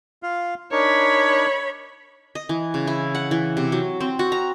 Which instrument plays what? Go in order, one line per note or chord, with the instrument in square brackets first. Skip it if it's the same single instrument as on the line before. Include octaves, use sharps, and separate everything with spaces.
[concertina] F4 F5
[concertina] D4 D#4 A#4 [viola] C#5 B5
[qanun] D#5
E3
C#3
E4
F#5
E3
C3
F#3
C4
F#4
A#5